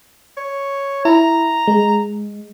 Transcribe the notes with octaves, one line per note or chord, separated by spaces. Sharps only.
C#5
E4 A#5
G#3